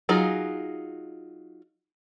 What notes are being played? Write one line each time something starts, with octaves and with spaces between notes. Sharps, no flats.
F#3 D#4 F4 G#4